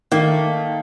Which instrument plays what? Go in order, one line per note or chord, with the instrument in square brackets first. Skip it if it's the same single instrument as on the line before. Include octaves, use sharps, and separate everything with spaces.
[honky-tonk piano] D#3 [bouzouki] A3 A#3